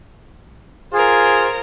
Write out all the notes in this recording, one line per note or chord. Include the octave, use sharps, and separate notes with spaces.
F4 G#4 A#4 C5